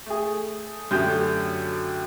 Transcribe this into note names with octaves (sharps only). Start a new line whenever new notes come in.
A3 G#4
F#2 D3 A3 G4 G6